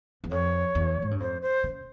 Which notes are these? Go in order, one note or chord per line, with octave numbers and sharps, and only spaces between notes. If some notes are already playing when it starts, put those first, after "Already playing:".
E2
F2 C#5
E2
G#2
G2
F2 C5
C5
C#3